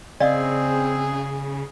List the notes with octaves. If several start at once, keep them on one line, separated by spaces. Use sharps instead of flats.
C#3 C4 G#4 D5 D#5 F5